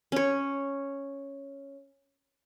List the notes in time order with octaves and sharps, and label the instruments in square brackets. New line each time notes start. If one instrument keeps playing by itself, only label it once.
[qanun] C#4 C#5